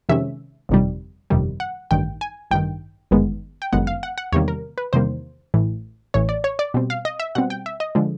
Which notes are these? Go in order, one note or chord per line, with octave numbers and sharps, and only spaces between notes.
F2 C3 D#3 G#3 C#4 E5
G1 F2 C3 D#3 G3
G1 F2 C3 D#3 G3
F#5
A1 G2 D#3 G5
G#5
A1 G2 D#3 G5
G1 F#2 D#3 G#3 B3
G5
G1 F#2 D#3 G#3 B3 F#5
F5
F#5
F#5
E2 C3 D#3 G3 A#3 C#5
A#4
B4
E2 C3 D#3 G3 A#3 C5
A1 A2 E3
A1 A2 E3 C#5
D5
C#5
D5
B2 G3 C4
F5
D#5
E5
B2 G3 C4 F#5
G5
E5
D#5
D3 F3 G#3